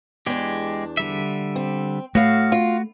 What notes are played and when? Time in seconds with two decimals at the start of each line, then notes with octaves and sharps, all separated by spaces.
0.26 E2 G#3 D4 G4
0.97 D3 G3 E5
1.56 C4
2.15 A2 A3 F#4 F5
2.52 F4